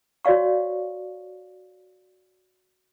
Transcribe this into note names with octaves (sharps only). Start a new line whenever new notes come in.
F#4 C#5 D5 F5 C#6